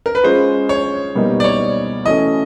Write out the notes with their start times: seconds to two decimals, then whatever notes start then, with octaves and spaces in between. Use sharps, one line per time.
0.06 A#4
0.15 B4
0.23 G#3 C#4 F4 G#4 C5
0.69 C#5
1.15 B2 G3 A#3 D#4
1.40 D5
1.44 C#5
2.05 E3 A3 C#4 F#4 A4 D#5